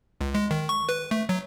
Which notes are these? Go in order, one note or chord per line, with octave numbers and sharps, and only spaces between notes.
C#2
G#3
D#3
C#6
B4
A3
F#3